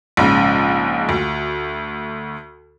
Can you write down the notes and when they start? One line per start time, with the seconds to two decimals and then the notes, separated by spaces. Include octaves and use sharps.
0.17 A#1 G#2 C#3
1.09 D2